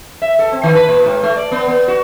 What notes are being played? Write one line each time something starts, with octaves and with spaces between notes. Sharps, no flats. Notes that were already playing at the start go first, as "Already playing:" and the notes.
E5
A4
C4
D#3
B4
A#2
G#2
A3
D5
B3
B3
F#4